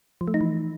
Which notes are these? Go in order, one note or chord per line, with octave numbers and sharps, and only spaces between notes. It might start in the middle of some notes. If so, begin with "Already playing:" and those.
F3
A3
D#4
E3